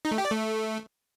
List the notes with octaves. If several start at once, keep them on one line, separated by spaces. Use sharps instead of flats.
D#4
A3
G4
D5
A3